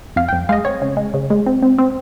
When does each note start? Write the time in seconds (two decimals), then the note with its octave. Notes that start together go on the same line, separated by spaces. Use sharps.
0.16 F2 F5
0.28 F2 G5
0.49 G#3 F5
0.52 D#5
0.65 C4 C#5
0.82 C#3
0.97 G#3
1.14 C#3
1.30 G#3
1.46 C4
1.63 C4
1.78 C4